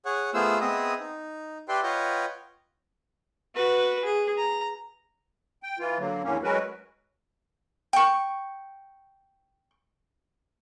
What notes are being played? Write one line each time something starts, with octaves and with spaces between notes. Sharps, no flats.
G#4 C#5 F#5
A3 B3 F4 G#4 C5 E6
B3 C4 G#4 D#5 E5 D#6
D#4
G4 B4 D5 E5 G5 C6
F4 B4 C#5 D#5 F#5 G5
F#4 B4
G#4
A#5
G5
E3 F4
D3 F#3 A#3
E2 A2 D3 A#3 C#4
F#3 G#3 C#4 F#4 A#4 B4
G5 C#6